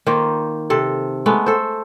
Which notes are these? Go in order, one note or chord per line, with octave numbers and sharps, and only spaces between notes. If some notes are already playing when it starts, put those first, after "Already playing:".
D#3 A#3 F4 C5
C3 A4
G#3 A3 B3
A4 C5